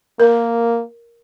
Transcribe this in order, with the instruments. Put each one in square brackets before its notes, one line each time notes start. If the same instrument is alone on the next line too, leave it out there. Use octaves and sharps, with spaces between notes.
[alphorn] A#3 [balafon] A#4